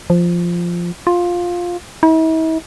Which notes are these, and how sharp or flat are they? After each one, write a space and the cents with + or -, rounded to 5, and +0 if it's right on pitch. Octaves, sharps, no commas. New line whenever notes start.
F3 -5
F4 +10
E4 -45